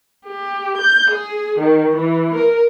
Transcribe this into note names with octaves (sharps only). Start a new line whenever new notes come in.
G4
G6
G#4
D#3
E3
A#4